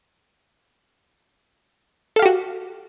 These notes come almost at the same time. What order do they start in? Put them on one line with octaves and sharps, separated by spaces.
A4 F5 G4 F#4